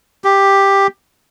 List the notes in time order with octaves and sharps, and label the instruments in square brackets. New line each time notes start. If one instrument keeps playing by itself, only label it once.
[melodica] G4